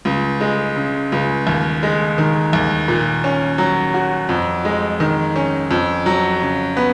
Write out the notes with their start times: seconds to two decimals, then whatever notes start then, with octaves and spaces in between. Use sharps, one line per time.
0.05 C#2
0.41 G#3
0.76 C#3
1.12 C#2
1.47 D#2
1.83 G#3
2.18 D#3
2.53 D#2
2.88 A#2
3.24 C#4
3.58 F#3
3.94 F#4
4.29 F2
4.65 G#3
5.00 D#3
5.36 C#4
5.71 F2
6.06 F#3
6.42 C#3
6.77 B3